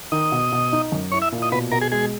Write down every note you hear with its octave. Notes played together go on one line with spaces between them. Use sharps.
D#3 D#5
B2
B2
D#4
F#2
E4 C#5
E5
A#2
D#5
B2 B4
B2 A#4
G#4
G#3 G#4